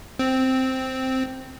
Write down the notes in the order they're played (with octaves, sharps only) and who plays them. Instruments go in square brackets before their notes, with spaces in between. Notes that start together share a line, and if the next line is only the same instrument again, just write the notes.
[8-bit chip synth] C4